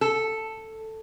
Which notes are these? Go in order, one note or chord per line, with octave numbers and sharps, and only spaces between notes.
A4